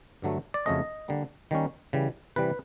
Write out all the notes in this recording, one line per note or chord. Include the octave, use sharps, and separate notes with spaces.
G2 D3 F#3 A3
D5
F2 C#3 F#3 A3 C#4 D#5
D3 G3 A#3
D#3 G3 A#3 C#4
C#3 E3 G3
C3 E3 G3 B4